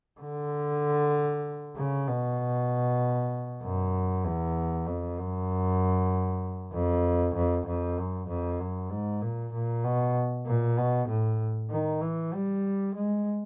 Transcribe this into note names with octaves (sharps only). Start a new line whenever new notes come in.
D3
C#3
B2
F#2
E2
F2
F#2
F2
F2
F2
F#2
F2
F#2
G#2
A#2
A#2
B2
A#2
B2
A2
D#3
E3
G3
G#3